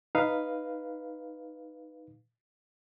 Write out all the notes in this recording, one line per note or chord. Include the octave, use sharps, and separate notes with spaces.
D#4 B4 F5